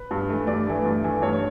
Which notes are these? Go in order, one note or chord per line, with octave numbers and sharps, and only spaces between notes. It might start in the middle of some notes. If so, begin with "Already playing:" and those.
Already playing: B4
G2
E3 A3
G2 D5
E3 A3
G2
E3 A3
G2 C#5